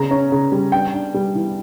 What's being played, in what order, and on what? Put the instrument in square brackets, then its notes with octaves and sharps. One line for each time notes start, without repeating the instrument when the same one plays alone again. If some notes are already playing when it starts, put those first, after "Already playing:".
Already playing: [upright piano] C#3 A#5
C#4
C#3
G3
D4 G5
D4
G3
E3